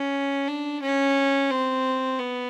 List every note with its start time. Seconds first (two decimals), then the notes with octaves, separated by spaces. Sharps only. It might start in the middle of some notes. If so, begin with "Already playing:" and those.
Already playing: C#4
0.48 D4
0.82 C#4
1.50 C4
2.19 B3